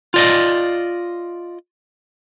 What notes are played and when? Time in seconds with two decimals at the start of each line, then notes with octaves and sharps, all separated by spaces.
0.14 F4 D5 D#5